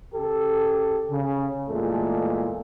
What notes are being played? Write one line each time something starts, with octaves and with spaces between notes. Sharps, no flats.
C#3 G4 A4
C#3
E2 A#2 G#3 A3 A4